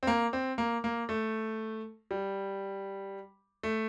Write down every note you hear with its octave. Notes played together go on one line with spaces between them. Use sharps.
C4
A#3
C4
A#3
A#3
A3
G3
A3